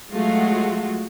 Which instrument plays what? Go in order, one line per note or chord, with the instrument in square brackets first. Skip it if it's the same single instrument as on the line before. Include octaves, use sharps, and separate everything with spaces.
[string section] F#3 G#3 A3 F4 F#4